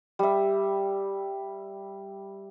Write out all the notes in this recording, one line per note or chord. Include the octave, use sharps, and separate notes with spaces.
G3 E5